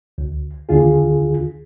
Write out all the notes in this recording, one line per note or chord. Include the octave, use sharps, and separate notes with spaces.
D2
D#2 D3 F4 G#4